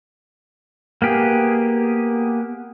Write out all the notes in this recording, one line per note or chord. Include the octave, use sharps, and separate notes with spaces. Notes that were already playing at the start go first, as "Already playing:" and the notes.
A#3 B3 G4 G#4